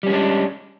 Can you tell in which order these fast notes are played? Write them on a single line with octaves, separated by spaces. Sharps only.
G3 C#4 G#3 D4